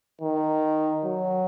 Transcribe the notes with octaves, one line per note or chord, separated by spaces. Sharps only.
D#3
F#3